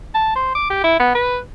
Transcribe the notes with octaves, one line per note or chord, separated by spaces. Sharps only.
A5
C5
D6
G4
E4
B3
B4